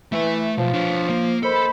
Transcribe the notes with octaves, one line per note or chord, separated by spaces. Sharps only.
E3 A3 E5
B1 F3
D4 C#5
A#3
D#3 A4 C5 B5